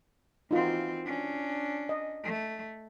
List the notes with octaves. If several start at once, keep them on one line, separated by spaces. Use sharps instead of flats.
E3 C4 D#4 F4 F#4
C#4 D4
D#5
A3